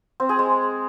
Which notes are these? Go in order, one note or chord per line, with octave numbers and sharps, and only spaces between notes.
C4
G#4
G#3